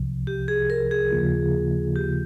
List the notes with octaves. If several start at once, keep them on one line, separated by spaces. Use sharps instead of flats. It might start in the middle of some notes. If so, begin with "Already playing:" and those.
Already playing: C2 C3 F3
G4
G#4
A#4
G#4
D#2 C#3 F3 A#3 F4
G4